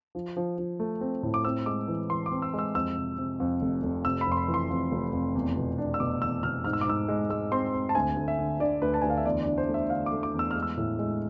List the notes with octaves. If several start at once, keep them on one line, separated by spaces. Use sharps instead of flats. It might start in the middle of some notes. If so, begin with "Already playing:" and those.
F3
F3
F3
A3
C4
A2
D6
C4 E6
G#3 D6
E3
E3 C6
D6
C4
E6
G#3
E6
F2 E6
C3
C3
F2
F1
F1
C3 E6
B5
F2
C6
B5
E3
C6
F2
F1
F2
E2
B2
D4
E6
B2 D6
E2 E6
B2 F6
G#2 F6
E6
D6
G#2 E6
G#3
G#3 E6
C4 C6
C4
A5
D2 G#5
D2
E5
D3
D3 D5
D2 B4
A5
D2 G#5
F5
E5
E2 D5
D5
D4
C5
A3
E5
D3 F5
D6
A3
D6
E2
E6
G#3 F6
E6
A2
G#3